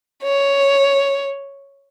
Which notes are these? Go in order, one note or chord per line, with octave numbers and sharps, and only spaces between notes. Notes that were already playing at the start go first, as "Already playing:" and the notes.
C#5